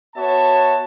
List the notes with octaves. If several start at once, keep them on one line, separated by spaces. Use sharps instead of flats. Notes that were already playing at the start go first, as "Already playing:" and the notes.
B3 F#4 C#5 E5 A5